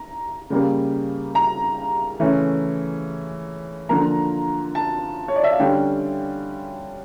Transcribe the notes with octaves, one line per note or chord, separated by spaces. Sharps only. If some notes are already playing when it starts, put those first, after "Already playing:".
Already playing: A#5
C#3 G3 A#3
A#5
C#3 E3 A3 C#4
D3 F3 A#3 A#5
A5
C#5
D5
E5
F5
D3 G3 C#4 G5